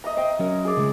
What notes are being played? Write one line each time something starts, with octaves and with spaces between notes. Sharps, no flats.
D#5 E5 A#5
C5 D#5 G5
F#3 C#4 A#4
G#4 D5
C#3 G#3